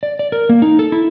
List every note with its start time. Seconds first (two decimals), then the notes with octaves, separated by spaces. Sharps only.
0.03 D5
0.19 D5
0.32 A#4
0.49 A#3
0.62 D#4
0.79 A4
0.92 E4